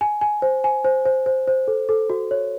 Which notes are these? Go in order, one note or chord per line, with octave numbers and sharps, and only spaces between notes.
G#5
G#5
C5
G#5
C5
C5
C5
C5
A4
A4
F#4
C#5